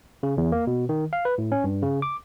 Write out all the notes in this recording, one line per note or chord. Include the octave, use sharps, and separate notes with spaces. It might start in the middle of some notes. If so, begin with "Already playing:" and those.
C#3
E2
A#3
B2
D#3
F5
B4
A2
C#4
G2
C#3
D6